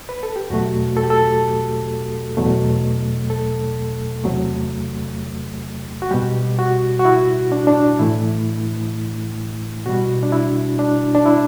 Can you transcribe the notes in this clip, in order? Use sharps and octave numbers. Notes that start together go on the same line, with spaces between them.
B4
A4
G4
E2 B2 F#3 A3 F#4
A4
G4
A4
E2 B2 F#3 A3
A4
E2 C3 F#3 A3
F#4
B2 G3 G4
F#4
F#4
E4
D4
D4
A2 E3 A3 E4
B2 G3 F#4
D4
E4
D4
D4
E4